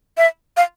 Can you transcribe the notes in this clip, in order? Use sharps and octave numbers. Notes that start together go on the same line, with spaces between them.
E5
F5